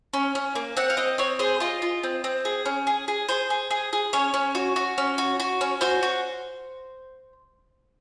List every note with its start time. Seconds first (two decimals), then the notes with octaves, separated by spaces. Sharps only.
0.13 C#4
0.35 C#4
0.55 A#3
0.77 C4 F#5
0.90 F5
0.97 C4 D#5
1.18 C4 C#5
1.39 G#4 C5
1.60 F4 D#5
1.82 F4
2.03 C4
2.24 C4
2.45 G#4
2.65 C#4
2.87 G#4
3.08 G#4
3.29 G#4 C5
3.50 G#4
3.71 G#4
3.93 G#4
4.13 C#4 C#5
4.34 C#4
4.55 F#4
4.76 F#4
4.98 C#4
5.18 F#4
5.40 F#4
5.61 C#4
5.81 F#4 C5
6.03 F#4